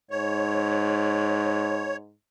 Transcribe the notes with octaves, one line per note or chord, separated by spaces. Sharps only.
G#2 C#5